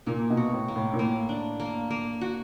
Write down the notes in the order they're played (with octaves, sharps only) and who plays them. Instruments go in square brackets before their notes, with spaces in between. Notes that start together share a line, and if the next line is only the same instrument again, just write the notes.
[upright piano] A#2 [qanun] A#3
[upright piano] B2
[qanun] F#4
[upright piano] A2
[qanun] A#3
[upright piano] A2
A#2
[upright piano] A2 [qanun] A#3
[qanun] D4
A#3
A#3
F#4